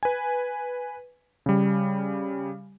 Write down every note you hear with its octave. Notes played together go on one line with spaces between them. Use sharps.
B4 G#5
C#3 G3